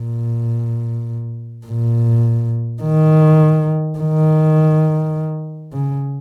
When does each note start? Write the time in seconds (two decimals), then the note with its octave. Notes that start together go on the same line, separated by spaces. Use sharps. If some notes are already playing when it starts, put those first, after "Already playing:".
Already playing: A#2
1.67 A#2
2.83 D#3
3.99 D#3
5.73 C#3